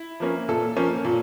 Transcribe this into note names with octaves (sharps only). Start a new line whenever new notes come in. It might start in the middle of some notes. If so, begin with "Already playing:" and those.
Already playing: E4
F3 A#3 C#4
A#2 A4
F3 A#3 C#4
A#2